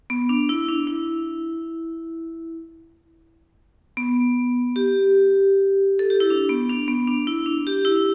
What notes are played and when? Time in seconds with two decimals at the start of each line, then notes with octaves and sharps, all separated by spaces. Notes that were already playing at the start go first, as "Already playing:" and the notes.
0.10 B3
0.29 D4
0.49 E4
0.69 D4
0.87 E4
3.97 B3
4.76 G4
5.99 A4
6.10 G4
6.20 E4
6.30 D4
6.49 B3
6.69 D4
6.88 B3
7.07 D4
7.27 E4
7.46 D4
7.67 G4
7.85 E4